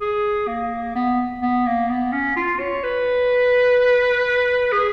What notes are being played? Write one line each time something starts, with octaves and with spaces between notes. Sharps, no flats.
G#4
A#3
B3
B3
A#3
B3
C#4
F4
C#5
B4
G#4